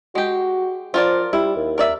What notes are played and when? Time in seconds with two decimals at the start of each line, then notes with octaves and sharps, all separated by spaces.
0.15 G#3 F#4 G4
0.94 F3 F4 A#4 D5
1.33 G3 E4
1.56 D#2
1.78 A#4 D5 E5